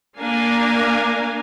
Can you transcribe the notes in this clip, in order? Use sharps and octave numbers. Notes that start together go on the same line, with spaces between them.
A#3 D4 A#4 F5 G#5